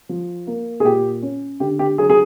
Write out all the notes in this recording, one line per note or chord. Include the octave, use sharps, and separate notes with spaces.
F3
A#3
G#4
A#2 G4
C#4
D3 G4
G4
F#3 G#4
G#4